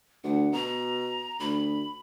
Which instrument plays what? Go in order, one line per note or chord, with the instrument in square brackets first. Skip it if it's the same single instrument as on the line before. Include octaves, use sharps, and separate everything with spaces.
[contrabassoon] D2 [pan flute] F#5
[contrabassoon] B2 [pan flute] A#5
[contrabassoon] D2 [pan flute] B5